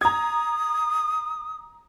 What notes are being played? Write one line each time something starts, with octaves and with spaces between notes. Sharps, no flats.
A#5 D#6 G#6